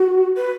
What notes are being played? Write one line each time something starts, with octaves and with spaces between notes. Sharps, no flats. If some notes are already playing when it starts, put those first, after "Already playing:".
Already playing: F#4
B4